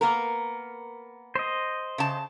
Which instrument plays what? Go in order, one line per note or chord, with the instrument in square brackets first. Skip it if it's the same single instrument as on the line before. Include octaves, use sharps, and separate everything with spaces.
[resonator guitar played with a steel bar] A#3 B3 A#4
[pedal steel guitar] C5 D#5
[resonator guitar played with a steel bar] C#3 A5